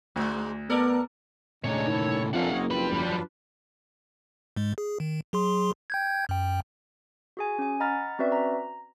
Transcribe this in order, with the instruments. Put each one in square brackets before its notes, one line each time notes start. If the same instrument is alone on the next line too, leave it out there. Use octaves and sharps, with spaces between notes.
[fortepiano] D2 [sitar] G#2 G#3
[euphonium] B3 [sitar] A4 A#4 D5
[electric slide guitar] A#2 C#3 A3 [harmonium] G#3 D4 D#4 [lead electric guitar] C#5
[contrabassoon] D#3 [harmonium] E4 A4
[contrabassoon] F2 [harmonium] C#4 A4 [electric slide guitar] D4 F4 A#4 [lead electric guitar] F5 F#5
[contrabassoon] F#1 [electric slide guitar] A#3 [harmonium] C4 C#5 D#5
[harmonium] F3 C4 F4 [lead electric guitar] G3 B5 [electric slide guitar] B4
[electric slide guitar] F#2 F3 F#3 [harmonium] D4 F4 B4
[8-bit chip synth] G#2 G#3
G#4
D#3
F#3 G#4 C6
G5 G6 G#6
F#2 G5
[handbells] F#4 G#4 G#5
C#4 G#5
D#5 F#5 A#5 B5 F6 A6
C4 C#4 F#4 B4 D5 E5
A#5